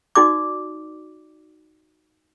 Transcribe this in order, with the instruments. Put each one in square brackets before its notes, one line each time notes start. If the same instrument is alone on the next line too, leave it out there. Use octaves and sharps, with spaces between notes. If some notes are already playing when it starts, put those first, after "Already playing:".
[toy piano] D#4 F#4 D5 D6